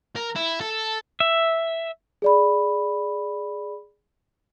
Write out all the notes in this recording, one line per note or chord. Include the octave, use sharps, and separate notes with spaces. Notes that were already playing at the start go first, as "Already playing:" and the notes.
A#4
E4
A4
E5
G#4 D5 B5